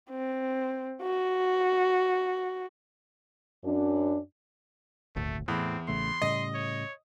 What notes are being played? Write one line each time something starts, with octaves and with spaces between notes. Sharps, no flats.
C4
F#4
F#2 D4
D#1 G#1 D2 A3
E2 A2 C4
A1 C#3 A3 C6
A2 C#3 G3 D#5
C#5